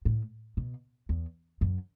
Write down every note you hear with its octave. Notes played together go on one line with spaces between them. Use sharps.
A2
B2
E2
F#2